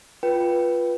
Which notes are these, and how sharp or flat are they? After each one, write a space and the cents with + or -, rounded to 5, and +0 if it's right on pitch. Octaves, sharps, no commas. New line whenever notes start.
F4 +0 B4 -15 G5 -10